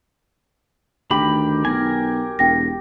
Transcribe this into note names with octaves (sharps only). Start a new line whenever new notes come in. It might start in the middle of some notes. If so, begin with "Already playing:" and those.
D2 D#3 G4 B5
B1 A#4 G#5
E1 G5 A#6